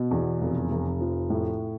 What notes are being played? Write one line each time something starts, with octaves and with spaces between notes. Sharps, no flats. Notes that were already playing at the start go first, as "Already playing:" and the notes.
Already playing: B2
E2
F1
F1
F3
A2